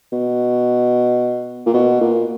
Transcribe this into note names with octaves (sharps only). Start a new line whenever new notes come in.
B2
A#2
B2
A#2